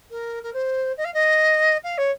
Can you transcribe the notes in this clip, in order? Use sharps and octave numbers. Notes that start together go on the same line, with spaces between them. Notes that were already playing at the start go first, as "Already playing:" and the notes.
A#4
A#4
C5
D#5
F5
D#5
F5
C#5